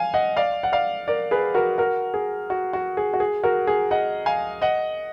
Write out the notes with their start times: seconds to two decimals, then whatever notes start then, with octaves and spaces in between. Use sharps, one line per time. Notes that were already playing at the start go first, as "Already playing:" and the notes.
Already playing: F5 G#5
0.14 D#5 F#5
0.37 D5 F5
0.63 F#5
0.72 D5 F5
1.08 A#4 D5
1.31 G#4 B4
1.54 F#4 A#4
1.78 F#4 A#4
2.14 G#4
2.50 F#4
2.73 F#4
2.97 G#4
3.14 F#4
3.20 G#4
3.43 F#4 A#4
3.67 G#4
3.91 D#5 F#5
4.26 F5 G#5
4.62 D#5 F#5